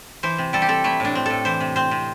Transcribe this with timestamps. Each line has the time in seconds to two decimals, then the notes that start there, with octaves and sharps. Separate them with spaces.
0.23 E3 C5
0.38 C3
0.53 G3 A4
0.62 G4
0.68 C4 A4
0.84 A3 E4
1.00 A2 D4
1.15 C4
1.26 A2 A4
1.45 E3 C5
1.60 C3
1.76 C4 C5
1.91 C3